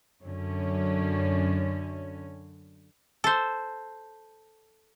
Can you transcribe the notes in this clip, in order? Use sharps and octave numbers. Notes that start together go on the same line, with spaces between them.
F#2 D3 C#4
A4 C5